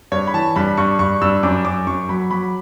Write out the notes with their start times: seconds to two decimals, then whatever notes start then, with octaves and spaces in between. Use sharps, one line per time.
0.12 G2 C#5
0.27 B5
0.34 E3 A5
0.56 G2 B5
0.77 G2 C#6
0.99 G2 C#6
1.21 G2 E6
1.43 F#2 D6
1.65 F#2 D6
1.87 F#2 C#6
2.09 F#3 B5
2.31 F#3 B5